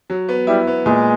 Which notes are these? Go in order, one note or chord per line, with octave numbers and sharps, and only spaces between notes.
F#3
B3
G3 E4
B3
A#2 G#3